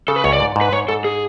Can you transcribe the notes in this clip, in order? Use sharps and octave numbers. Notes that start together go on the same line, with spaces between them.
C#3 A4
B4
C#2 C#5
D5
G#2
G#2
B4
G#2 C#5
G#2 A4
G#4